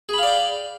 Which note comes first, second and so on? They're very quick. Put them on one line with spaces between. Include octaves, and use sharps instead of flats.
G#4 B5 F5 D5 G5